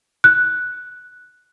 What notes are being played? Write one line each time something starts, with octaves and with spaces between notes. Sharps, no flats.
F#6